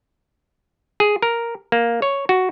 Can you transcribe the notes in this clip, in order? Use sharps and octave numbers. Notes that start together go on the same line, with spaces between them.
G#4
A#4
A#3
C#5
F#4